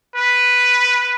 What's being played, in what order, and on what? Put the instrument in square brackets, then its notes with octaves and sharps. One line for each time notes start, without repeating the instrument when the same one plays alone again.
[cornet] B4